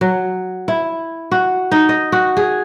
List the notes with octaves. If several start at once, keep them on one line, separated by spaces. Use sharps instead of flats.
F#3
E4
F#4
D#4
D#5
F#4
G#4